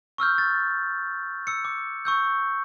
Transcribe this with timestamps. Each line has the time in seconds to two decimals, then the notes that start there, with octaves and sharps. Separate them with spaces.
0.18 C#6 E6 F6 G6
0.38 A6
1.47 E6 C#7
1.65 D6
2.05 C#6 E6 G6